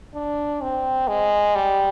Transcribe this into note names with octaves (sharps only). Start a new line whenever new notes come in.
D4
C4
G#3
G3